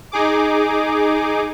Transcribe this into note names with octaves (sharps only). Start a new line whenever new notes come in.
D#4 G#4 D6